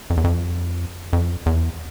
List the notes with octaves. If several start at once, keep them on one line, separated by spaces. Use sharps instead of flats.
F2
E2
F2
F2
E2